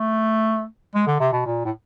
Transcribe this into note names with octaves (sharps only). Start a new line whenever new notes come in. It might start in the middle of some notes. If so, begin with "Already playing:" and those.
Already playing: A3
G#3
D3
C3
B2
A#2
A2